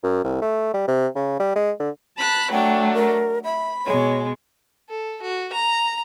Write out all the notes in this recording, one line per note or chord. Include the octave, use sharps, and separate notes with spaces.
F#2
C2
A3
G3
C3
C#3
G3
G#3
D3
A5 B5 F#6
F#3 A3 D4 G5
A#4
E5 B5
B2 G#3 C#5
A4
F#4
A#5